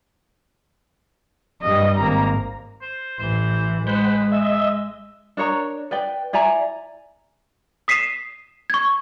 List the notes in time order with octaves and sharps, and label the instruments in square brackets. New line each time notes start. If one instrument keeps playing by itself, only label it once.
[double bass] G2 G3 [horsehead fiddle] D#5
[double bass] G#1 [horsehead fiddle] A#3 A#5
[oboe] C5
[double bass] A1 E3 [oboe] C5
[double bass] G#3 [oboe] B4 [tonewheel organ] C5 F#5 G5
[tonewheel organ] D#5 E5 [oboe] E6
[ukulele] D4 A#4 C#5 A#5
B4 D5 G5
E4 D5 G#5 A#5
[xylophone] D#6 B6 C7 D#7 E7
C#6 G#6